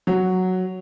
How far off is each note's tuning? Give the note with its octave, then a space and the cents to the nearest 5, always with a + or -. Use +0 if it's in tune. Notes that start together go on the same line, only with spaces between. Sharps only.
F#3 +0